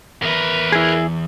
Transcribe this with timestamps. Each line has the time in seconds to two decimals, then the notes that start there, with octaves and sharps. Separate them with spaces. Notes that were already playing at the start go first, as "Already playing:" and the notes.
0.23 E2 A#4 B4 E5
0.72 E4 G#4